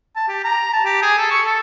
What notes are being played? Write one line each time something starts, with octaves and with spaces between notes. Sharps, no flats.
A5
G4
A#5
A5
G4
G#4
A4
C#6
A4